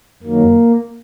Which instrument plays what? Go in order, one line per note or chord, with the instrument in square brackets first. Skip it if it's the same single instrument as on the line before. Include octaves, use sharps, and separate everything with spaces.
[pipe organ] F#2 D#3 F#3 A#3